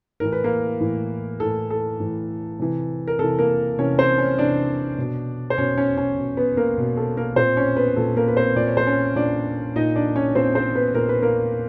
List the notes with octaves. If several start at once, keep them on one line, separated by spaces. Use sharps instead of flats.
A2 E3 A#4
B4
A#3 A#4
A2 E3
A2 E3 A4
A4
A2 E3
C3 E3
A#4
C3 E3 A4
A#3 A#4
C3 E3 C#4 C#5
C4 C5
C#4 C#5
C3 E3 D4 D5
B2
C5
B2 C#4 C#5
C#4 C#5
C#4 C#5
B2
B3 B4
A#3 A#4
B2
A4
A#3 A#4
A#2 C4 C5
C#4 C#5
B3 B4
A#2 A4
A#3 A#4
B4
C4 C5
A#2 D5
C#5
C5
C#4 C#5
A#2 D4 D5
A#2 D#4 D#5
D4 D5
C#4 C#5
A#2 C4 C5
C4 C5
B3 B4
A#2 A#4
B4
A#3 A#4